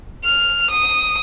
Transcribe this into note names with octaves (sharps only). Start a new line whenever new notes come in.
F6
D#6